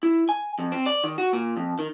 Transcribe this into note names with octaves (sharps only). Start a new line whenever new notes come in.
E4
G#5
F2
C4
D5
D#3
F#4
A#2
F2
D#3